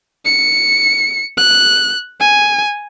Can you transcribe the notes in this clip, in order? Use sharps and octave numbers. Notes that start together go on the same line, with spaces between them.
C#7
F#6
G#5